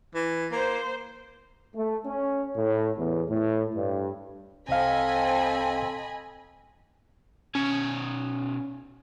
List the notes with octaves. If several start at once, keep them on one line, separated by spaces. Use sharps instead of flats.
E3
A#3 C5
A3
C#4
A2
E2
A2
G2
C2 C4 A4 D#5 F5 G#5 B5
B2 C#4 C#5 G#5